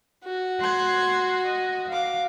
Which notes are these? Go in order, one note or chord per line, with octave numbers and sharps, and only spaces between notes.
F#4
C6 F#6 G#6
D#5
F5 D6